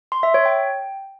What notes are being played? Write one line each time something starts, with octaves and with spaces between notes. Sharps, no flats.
C6
E5
C#5
G5